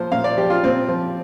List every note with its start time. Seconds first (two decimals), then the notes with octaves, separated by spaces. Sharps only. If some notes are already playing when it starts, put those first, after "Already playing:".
Already playing: A#2 F3 C5
0.12 A#2 F5
0.24 D5
0.37 F3 G4
0.50 F4
0.63 A#2 C4
0.89 F3